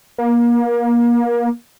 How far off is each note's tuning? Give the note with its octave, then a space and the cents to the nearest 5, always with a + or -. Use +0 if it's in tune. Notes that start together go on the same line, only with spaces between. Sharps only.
A#3 +30